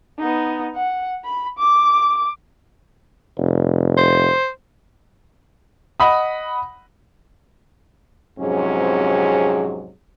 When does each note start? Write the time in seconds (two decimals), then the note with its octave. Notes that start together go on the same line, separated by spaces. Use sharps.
0.19 B3 D#4
0.76 F#5
1.25 B5
1.59 D6
3.38 F1
3.97 C5
6.00 D#5 F#5 B5 D#6
8.40 F2 G#2 C3 F#3 C#4 G#4